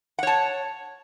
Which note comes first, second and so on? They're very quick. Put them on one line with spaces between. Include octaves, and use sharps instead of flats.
F#5 C#5 A5